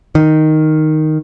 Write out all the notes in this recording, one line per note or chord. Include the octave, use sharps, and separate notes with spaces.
D#3